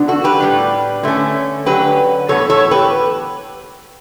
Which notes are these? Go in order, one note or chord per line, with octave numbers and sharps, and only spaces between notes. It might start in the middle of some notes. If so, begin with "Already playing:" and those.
Already playing: D3 F#3 B3 D4
F#4 A4
G4 B4
A2 G3 D4
D3 A3 C#4
D3 F#3 C#4 G4 B4
A2 E3 B3 A4 C#5
A4 C#5
G4 B4